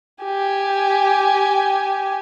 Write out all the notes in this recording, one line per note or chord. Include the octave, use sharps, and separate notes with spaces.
G4 G#5